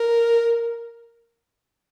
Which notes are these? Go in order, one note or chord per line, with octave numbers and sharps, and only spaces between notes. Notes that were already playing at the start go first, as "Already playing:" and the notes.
Already playing: A#4